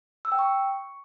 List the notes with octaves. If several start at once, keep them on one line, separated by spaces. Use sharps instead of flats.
E6
G5
C#6